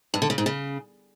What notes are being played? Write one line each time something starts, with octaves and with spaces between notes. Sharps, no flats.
G2
D3
C#3
G#2
C#3